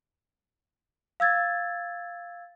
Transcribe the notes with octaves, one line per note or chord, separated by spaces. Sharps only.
F5 E6 G#6 A6